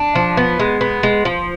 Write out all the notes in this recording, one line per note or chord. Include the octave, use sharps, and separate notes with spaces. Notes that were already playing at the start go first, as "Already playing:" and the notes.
Already playing: D4
F3
B3
G#3
B3
G#3
F3